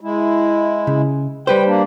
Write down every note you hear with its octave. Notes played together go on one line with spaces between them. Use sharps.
G#3 E4
C#3
G3 B4 C5 G5
A#3 D4